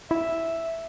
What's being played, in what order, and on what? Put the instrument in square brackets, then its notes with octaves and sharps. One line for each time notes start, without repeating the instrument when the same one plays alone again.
[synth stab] E4 [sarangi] E5